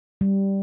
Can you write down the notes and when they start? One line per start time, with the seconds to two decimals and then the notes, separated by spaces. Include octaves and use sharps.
0.21 G3